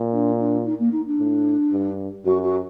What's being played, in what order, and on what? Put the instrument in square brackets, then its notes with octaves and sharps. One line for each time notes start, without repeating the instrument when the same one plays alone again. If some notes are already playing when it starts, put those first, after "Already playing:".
Already playing: [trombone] A#2
[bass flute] D4
D4
D#4
A#3
D#4
D4
[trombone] A2
G2
[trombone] F#2 [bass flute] F#4
[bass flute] F#4